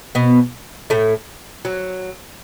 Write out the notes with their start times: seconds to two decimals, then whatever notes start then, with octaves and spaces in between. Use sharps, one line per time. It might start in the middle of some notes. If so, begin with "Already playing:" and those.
0.15 B2 B3
0.90 A2 A3
1.65 F#3